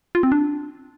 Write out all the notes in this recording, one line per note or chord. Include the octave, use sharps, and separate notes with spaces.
F4
C4
D4